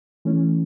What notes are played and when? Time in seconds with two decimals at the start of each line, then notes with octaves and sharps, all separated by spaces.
0.25 E3 A3 C#4